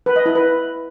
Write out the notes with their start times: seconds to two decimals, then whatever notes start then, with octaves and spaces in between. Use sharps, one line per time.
0.06 B4
0.16 D#5
0.26 E4
0.35 B4